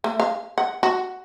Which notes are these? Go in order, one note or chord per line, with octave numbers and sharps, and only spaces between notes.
A3
F5
F#5
F#4